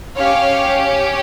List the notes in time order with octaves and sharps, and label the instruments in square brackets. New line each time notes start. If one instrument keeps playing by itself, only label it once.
[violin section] C#4 G4 C#5 F5